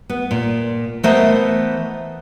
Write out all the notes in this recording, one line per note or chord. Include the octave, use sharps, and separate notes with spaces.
B3
A#2
E3 A3 B3 A#4 C5 D#5